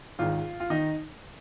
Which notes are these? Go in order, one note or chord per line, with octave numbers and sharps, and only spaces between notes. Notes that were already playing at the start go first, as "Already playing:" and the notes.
G#1 G#2 D#3 F4
F4
D#3 D#4